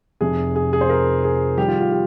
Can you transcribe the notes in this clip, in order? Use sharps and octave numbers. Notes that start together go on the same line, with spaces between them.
F1 F2 C3 F3 G#4
G#4
G#4
C5
A#4
G#4
F2 D#3 G3 G4
F4
F4
G4